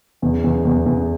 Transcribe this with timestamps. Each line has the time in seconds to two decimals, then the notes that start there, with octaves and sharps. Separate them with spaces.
0.22 E2
0.44 E2
0.65 E2
0.86 E2